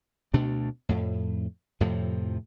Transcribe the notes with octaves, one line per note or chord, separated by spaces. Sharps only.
D2 B2 A3 D4
F2 A2
F2 A2 C3 F3